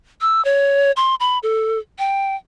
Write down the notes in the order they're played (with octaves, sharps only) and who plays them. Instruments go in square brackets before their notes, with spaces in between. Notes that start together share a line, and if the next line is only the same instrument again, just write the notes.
[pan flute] E6
C#5
C6
B5
A4
G5